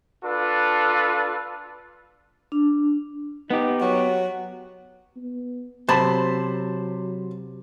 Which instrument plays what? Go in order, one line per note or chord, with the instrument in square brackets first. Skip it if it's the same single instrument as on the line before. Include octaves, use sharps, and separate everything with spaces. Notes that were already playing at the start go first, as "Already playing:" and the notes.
[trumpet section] D4 F4 A4 B4
[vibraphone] D4
[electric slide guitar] B3 G4 [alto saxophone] D#4
[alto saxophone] F#3 [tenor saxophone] F#4
[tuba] B3
[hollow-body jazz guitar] C3 [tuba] F#3 [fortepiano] C5 A5 B5